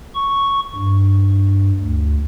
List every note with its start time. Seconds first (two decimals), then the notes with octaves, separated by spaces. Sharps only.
0.15 C#6
0.76 G2
1.81 D2